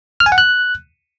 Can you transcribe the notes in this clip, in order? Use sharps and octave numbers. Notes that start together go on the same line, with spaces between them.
F6
G#5
F#5
F#6